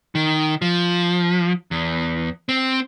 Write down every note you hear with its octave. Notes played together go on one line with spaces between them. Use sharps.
D#3
F3
E2
C4